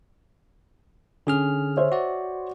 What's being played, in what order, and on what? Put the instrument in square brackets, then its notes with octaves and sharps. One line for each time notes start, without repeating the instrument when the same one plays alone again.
[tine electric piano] D3 G#4 F6 [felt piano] C#4
[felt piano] C5 C#5 E5
[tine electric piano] F#4 D5